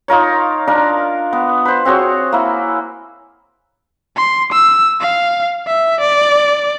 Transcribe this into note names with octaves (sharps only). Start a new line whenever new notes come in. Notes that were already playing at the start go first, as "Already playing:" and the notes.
D#4 F4 A#4 C#5
D4 A#4 F5
B3
B4 C5
C4 F#4 G#4 C#5
A#3 E4
C6
E6
F5
E5
D5